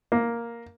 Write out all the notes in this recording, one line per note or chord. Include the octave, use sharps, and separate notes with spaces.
A#3